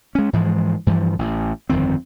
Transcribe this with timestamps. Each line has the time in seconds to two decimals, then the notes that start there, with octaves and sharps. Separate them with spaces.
0.15 G#3 C#4
0.33 G#2 E3 F3 G#3
0.87 G2 E3 F3
1.19 A1
1.69 G1 F2 D#3 C4